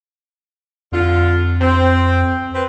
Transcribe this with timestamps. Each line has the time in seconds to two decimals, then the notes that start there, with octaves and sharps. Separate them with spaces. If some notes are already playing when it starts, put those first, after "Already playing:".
0.92 F2 D3 F4
1.60 C4
2.54 C4 B4